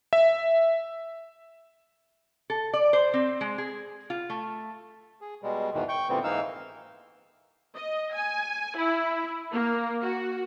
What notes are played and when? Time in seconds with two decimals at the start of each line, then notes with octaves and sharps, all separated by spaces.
0.13 E5
2.50 A4
2.73 D5
2.93 C5
3.14 C4
3.41 G#3
3.58 G#4
4.10 F4
4.30 A3
5.21 G#4
5.43 B2 G3 G#3
5.74 E2 G#2 B2 D#3 E3
5.89 G5 C#6 G6
6.09 A#2 D3 E3 G3 B3 C4
6.24 G#2 E3 A#3 D#4 F5 E6
7.76 D#5
8.14 G#5
8.77 E4
9.52 A#3
10.02 F#4